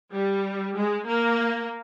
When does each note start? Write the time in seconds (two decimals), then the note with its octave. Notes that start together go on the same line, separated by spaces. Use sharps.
0.12 G3
0.76 G#3
1.07 A#3